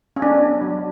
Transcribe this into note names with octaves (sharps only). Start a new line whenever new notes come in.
C#4
B3 D4
F#3